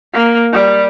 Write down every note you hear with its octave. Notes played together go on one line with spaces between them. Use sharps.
A#3
G3